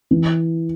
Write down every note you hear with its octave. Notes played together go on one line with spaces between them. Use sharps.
E3